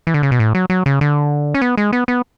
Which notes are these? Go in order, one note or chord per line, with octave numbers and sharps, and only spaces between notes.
E3
D3
C#3
B2
A2
F#3
F#3
C#3
D3
C#4
B3
G#3
B3
B3